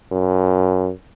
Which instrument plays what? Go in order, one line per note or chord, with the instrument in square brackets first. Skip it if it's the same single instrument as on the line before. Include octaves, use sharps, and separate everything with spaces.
[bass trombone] F#2